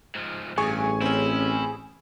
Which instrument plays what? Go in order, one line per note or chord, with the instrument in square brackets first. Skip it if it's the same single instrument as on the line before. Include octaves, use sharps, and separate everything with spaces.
[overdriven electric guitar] G#2 F3
[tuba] A1 [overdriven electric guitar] G2 [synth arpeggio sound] G#4 [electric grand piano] G#5 C#6
[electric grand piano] C4 C#4 [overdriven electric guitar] E4